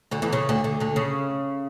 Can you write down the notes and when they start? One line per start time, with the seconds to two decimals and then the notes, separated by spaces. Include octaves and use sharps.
0.11 D2 D3
0.22 E2 E3
0.33 C#3
0.49 D2 D3
0.64 D2 D3
0.80 D2 D3
0.96 C#3